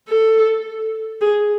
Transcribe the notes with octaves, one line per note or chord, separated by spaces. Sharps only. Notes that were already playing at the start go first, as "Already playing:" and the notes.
A4
G#4